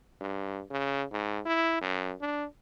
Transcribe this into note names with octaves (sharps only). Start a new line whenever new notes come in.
G2
C#3
G#2
E4
F#2
D4